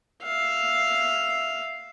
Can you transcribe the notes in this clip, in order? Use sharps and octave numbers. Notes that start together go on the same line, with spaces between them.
E5 F5